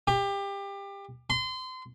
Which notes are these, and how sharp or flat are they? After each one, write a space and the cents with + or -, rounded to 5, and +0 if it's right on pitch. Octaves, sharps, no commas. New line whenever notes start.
G4 +25
C6 -30